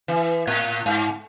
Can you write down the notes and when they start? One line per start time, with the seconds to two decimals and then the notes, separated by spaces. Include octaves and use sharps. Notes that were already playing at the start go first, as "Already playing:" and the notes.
0.08 E3
0.47 A2
0.86 G#2